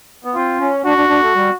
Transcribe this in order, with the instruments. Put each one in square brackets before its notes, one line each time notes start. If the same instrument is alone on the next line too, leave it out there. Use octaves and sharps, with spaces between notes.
[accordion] B3
[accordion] C4 [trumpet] F4
[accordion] C#4
[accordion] D4 [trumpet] F#4
[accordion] D4
D4
A3
G3